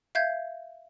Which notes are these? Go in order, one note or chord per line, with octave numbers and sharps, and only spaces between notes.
E5 F5 G6 G#6